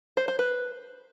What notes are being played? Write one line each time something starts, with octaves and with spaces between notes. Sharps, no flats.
C5
C5
B4